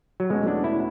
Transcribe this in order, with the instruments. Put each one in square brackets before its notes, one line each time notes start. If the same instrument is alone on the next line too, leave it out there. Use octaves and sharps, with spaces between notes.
[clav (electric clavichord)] F#3
[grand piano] E2 B2 A3 C#4 F#4 [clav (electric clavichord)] G#3
[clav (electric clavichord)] D4
E4